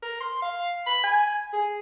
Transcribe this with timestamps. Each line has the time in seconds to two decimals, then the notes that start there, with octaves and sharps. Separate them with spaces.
0.02 A#4
0.20 C6
0.42 F5
0.86 B5
1.03 G#5
1.53 G#4